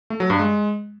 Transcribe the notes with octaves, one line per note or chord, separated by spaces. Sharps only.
A3
F#3
G2
G#3